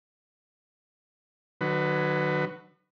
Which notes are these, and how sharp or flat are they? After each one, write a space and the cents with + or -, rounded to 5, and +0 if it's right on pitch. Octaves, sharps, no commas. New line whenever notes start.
D#3 -45 F#3 +0 B4 +15